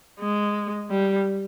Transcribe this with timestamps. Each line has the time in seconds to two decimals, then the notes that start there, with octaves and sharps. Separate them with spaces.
0.19 G#3
0.91 G3